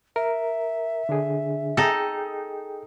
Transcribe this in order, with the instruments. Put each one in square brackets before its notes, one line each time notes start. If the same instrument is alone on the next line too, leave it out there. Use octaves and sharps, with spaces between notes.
[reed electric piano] A#4 [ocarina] E5
[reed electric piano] D3 D4 G#4
[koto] D#4 A4 [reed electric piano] G#4 G5